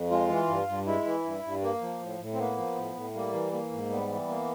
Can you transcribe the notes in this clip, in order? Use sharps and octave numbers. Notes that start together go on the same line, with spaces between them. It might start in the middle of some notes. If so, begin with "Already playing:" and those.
Already playing: F2
G#3 F4
E3
G2
G2
G#3 E4
E3
G2
G2
A#3
F3
A2
A2
C4
A#3 B3
F3
A2
A2
G3 A#3
E3
A#3
G#2
G3 B3
E3
A#3